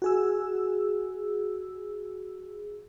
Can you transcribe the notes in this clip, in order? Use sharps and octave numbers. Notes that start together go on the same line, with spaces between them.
F#4 G#4 E6